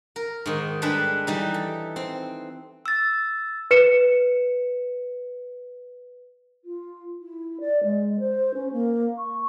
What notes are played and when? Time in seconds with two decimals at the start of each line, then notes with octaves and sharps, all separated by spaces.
0.16 A#4
0.46 G#2 D#3
0.82 G3 G#3 D4 A4 B4
1.27 E3 G3 D#4
1.54 A4
1.96 C4
2.86 E6 A6
3.71 B4 C#7 E7
6.64 F4
7.21 E4
7.60 D5
7.83 G#3
8.19 C5
8.54 C#4
8.72 A#3
9.18 C#6